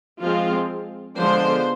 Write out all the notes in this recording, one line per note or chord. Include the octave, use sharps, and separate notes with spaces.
F3 G#3 C4 F4
D3 F3 G#3 B3 D4 C5